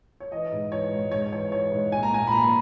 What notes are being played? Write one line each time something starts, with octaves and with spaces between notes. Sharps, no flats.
C#5
E3 D#5
G#2
E3 C#5
G#2
G#2 C#5
E3 C#5
E3 C#5
G#2
A#2 G#5
A#5
A#2 G#5
B5
A#2 A#5